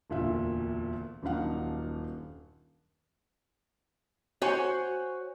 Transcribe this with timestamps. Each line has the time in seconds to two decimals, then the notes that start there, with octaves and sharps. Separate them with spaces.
0.10 E1 D2 A#2 F4 E5
1.22 D#1 F#2 D4 D#4 F5 F#5
4.42 F#4 C5 C#5 G#5